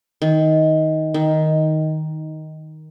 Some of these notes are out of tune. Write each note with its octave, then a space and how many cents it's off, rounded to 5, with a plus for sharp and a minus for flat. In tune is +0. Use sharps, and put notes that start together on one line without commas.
D#3 +15
D#3 +5